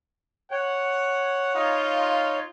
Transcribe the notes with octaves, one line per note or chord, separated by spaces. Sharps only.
C#5 F#5
D#4 F4